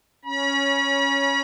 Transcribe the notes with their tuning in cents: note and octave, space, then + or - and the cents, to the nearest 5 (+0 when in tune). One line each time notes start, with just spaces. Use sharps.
C#4 +0 B5 -40